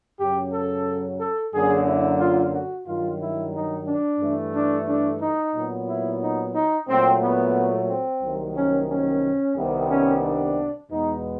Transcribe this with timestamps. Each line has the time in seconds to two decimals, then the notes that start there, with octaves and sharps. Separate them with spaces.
0.19 F#2 C#3 F#3 G4
0.52 A4
1.19 A4
1.53 F#2 D3 F#3 A#3 G#4
1.87 E4
2.20 F4
2.53 F#4
2.87 G2 D#3 F#3 F4
3.20 E4
3.54 D#4
3.87 D4
4.20 G2 E3 A3
4.54 D4
4.87 D4
5.21 D#4
5.54 A#2 F#3 B3
5.88 E4
6.21 D#4
6.55 D#4
6.88 A#2 F#3 A3 C4
7.22 B3
7.88 C4
8.22 C2 C3 D#3 F#3 A#3
8.56 C#4
8.90 C#4
9.56 C2 C3 D#3 G3 B3
9.90 C#4
10.24 D4
10.90 E2 B2 G#3 B3 D#4